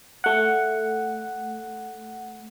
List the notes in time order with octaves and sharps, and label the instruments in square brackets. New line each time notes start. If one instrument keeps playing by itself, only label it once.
[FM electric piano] A3 F#5